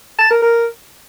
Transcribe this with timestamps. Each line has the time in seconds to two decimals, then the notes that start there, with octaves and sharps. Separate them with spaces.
0.19 A5
0.30 A#4
0.42 A#4